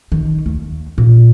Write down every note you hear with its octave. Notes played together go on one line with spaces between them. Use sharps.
D#3
D#2
A#2